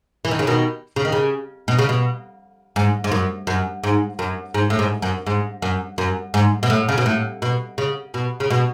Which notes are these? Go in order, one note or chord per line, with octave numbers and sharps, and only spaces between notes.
E3
D#3
C#3
B2 D#3
C#3
D#3
C#3
B2
C#3
B2
G#2
G#2
F#2
F#2
G#2
F#2
G#2
A2
G#2
F#2
G#2
F#2
F#2
G#2
B2
A2
C#3
B2
A2
B2
C#3
B2
C#3
B2